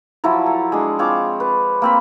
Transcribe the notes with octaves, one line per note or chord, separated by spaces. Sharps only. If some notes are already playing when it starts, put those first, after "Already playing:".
F3 F#3 E4 A#5
A4
G#3 D4
C4 F4 C#5 D6
B4
A#3 C4 B5